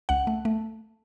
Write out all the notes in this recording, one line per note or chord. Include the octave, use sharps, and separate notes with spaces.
C#2 F#5
A3
A3